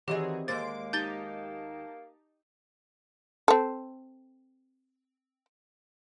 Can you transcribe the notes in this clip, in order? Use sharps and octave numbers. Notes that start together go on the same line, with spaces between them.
D#3 E3 F#3 C4 G4 G#4 D5 D#5
D#2 G#3 A#3 C5 D6 A6
D#4 G4 A5 G6 A6 G7
C4 A4